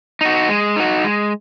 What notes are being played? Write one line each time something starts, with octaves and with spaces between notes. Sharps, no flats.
D#4 F#4
G#3
D#4 F#4
G#3